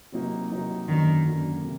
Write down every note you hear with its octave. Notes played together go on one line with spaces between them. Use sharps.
C3 F#3 A#3 D#4
C3 F#3 A#3 D#4
F#2 D3 D#3 F#3 A#3
F#2 D3 F#3 A#3
C3